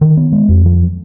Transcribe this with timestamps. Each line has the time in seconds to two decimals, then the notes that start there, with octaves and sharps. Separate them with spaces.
0.01 D#3
0.17 B3
0.32 G#3
0.48 F2
0.65 F3